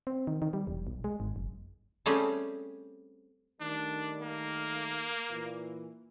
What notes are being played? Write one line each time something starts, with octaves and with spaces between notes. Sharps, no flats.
C4
D#3
D#3
G3
E1
B1
G#3
G#1
F#1
G3 A3 C4 C#4 G4 G#4
D#3 G3 A3 D4
A#3
A#2 E3